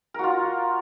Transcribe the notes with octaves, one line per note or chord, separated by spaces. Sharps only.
F4 F#4 A#4